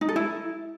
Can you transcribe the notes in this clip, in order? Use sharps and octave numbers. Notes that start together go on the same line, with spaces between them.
D#4
A4
E4